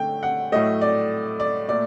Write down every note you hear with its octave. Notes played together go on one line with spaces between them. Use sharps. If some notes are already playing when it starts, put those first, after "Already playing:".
Already playing: D3 A3 G5
F#5
A2 F#3 A3 D#5
D5
D5
A#2 A3 D5